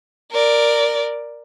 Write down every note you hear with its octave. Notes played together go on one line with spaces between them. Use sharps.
A#4 D5